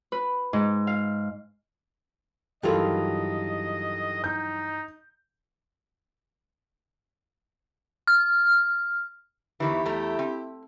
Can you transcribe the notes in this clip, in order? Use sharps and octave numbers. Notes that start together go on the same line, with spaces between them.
B4
G#2
F5
G2 D#3 E3 F#3 F4 G4 A4 D#5
D#4 G6
F6
E2 D#3 E3 E4 G4
E2 A3 A#5
C4